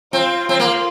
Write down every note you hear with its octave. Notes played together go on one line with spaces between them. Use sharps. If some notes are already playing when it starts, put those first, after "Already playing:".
C4 F4
C4 F4
A#3